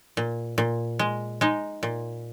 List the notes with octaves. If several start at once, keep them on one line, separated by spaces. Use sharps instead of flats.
A#2
A#2
G#3
G#3 D#4
A#2